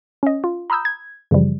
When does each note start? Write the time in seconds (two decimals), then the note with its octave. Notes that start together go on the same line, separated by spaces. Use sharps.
0.23 C#4 D#5
0.44 F4
0.70 A#5 B5 D#6 E6 G6
0.85 G#6
1.31 F#2 C#3 E3 F3 G3